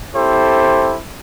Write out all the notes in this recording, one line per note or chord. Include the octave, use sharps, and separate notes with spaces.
C4 E4 G4 A4 C5